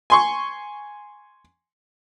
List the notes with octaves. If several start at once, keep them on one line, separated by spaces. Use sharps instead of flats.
G#5 C6 C#6